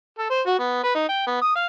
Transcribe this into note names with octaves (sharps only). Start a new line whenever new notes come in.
A4
C5
F#4
B3
B4
D#4
G5
B3
D#6
F5